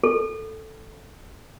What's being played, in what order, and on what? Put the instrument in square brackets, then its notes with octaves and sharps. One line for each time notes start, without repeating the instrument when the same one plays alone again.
[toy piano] A4